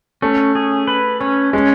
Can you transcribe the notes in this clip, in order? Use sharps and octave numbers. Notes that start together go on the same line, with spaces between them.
A3 C#4
G#4
B4
C#4
G#3 C#4